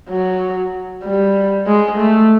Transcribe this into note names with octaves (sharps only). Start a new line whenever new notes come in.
F#3
G3
G#3
A3